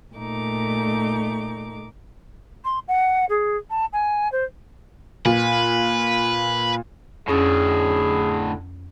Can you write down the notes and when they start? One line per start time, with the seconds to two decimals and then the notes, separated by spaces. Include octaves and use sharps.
0.15 A#2 A3 D#4 D6
2.64 C6
2.88 F#5
3.29 G#4
3.70 A5
3.93 G#5
4.32 C5
5.25 A#2 B4
7.28 F2 A2 D3 C#4 G#4 A6